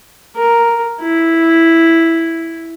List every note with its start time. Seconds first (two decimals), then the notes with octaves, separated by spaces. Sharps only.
0.36 A#4
1.01 E4